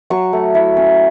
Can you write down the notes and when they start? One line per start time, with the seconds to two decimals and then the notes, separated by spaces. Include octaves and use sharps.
0.10 F#3 C#6
0.33 A3
0.55 E4
0.77 C#4